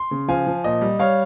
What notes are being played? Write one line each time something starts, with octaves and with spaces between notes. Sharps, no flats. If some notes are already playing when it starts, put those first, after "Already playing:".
Already playing: C6
C#3
F3 F5 G#5
F3
A#2 D#5
G3
G3 C#5 F5